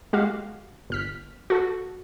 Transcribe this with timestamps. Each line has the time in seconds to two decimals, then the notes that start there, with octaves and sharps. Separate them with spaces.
0.13 G#3 F#4 G4 F5
0.90 G1 F6 B6
1.50 F#4 A4